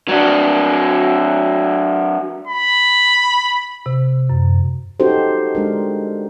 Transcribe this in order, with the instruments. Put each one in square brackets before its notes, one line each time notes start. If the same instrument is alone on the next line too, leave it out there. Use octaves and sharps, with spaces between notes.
[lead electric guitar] F#3 D4
[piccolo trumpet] B5
[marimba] C3
F#2
[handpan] C#4 D#4 F#4 G4 A4 C5
G#3 D4 A#4